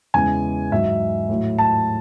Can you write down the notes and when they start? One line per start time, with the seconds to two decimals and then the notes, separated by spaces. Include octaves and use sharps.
0.14 E2 C#3 E3 G#3 G#5
0.71 G#2 F#3 E5
1.29 A2 F#3
1.58 A5